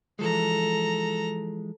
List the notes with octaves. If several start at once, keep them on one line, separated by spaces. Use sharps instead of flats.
E3 F3 G#3 A4 A#5